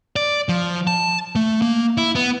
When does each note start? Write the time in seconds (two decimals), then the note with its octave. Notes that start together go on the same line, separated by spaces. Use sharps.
0.16 D5
0.49 F3
0.87 A5
1.35 A3
1.62 A#3
1.97 E4
2.15 B3